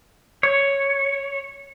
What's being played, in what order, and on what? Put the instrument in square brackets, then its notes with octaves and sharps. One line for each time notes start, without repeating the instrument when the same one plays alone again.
[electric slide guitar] C#5